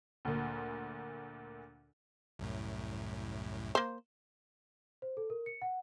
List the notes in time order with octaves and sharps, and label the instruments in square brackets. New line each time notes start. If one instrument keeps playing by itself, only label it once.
[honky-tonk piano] D2 A#2
[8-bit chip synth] C2 F#2 A2
[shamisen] A#3 C5
[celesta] C5
A4
A#4
C#7
F#5